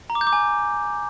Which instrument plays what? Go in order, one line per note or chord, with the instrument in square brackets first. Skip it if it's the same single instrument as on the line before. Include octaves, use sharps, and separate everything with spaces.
[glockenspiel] A#5
D6
G6
D6
G#5